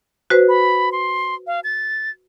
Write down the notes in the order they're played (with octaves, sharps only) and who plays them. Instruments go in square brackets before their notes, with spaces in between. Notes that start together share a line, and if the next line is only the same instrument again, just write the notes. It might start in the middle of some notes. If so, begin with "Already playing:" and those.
[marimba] F#4 B4 C5
[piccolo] B5
C6
F5
A6